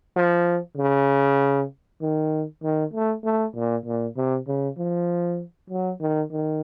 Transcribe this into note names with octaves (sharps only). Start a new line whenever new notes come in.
F3
C#3
D#3
D#3
A3
A3
A#2
A#2
C3
C#3
F3
F#3
D#3
D#3